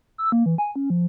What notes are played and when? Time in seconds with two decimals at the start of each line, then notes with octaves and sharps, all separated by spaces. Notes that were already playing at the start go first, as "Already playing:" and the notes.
0.18 E6
0.32 A#3
0.46 E3
0.58 G#5
0.76 C#4
0.90 F3